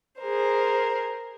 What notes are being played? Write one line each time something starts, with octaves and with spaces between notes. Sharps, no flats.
G#4 A#4 C5